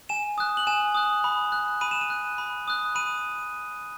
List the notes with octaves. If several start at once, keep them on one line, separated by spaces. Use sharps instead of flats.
G#5 E7
D#6 F#6
F#7
G#5 E7
D#6 F#6
B5
F#6
B5 D#7
E7
D#7
F#6
B5
D#6 F#6
B5 D#7